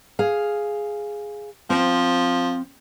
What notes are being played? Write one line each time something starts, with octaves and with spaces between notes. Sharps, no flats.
G#4 F5
F3 C4